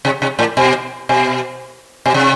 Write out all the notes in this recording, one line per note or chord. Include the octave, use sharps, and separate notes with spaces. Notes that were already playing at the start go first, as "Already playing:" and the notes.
C3
C3
A2
B2
B2
B2
C3